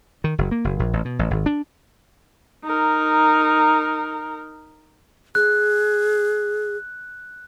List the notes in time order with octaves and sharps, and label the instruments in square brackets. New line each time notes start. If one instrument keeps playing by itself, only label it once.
[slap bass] D#3
F#1
A#3
F#1
A#1
A1
B2
A1
G#1
D4
[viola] D#4 A#4
[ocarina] G#4 [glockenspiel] F#6